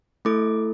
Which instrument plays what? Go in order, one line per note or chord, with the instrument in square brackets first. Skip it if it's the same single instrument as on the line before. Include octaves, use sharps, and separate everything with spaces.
[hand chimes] A3 E4 A4 D6